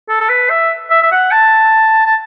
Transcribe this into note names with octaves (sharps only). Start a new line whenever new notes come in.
A4
A4
B4
E5
E5
E5
F#5
A5
A5